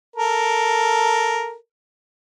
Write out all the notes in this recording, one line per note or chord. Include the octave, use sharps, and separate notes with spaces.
A4 A#4